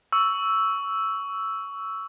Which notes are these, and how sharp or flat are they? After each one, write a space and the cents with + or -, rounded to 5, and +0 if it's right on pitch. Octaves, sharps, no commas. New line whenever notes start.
C#6 +20 E6 +0